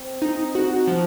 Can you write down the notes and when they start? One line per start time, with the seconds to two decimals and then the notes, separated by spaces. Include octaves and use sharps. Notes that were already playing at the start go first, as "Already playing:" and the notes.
Already playing: C4
0.22 D#4
0.55 F#4
0.88 F3